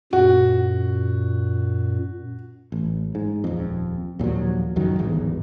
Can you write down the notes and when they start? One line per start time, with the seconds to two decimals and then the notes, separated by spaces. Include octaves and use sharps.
0.13 F#2 A#2 F#4
2.72 A1
3.15 G#2
3.44 D#1 F2
4.19 D#2 A#2 F3 F#3
4.76 C#2 F#2 D#3 F#3
4.99 D1 G#1 E2 G2